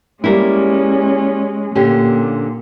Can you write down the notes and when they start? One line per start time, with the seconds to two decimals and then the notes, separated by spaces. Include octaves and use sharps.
0.24 G3 G#3 A#3 C#4 E4
1.75 A#2 D3 C#4 G4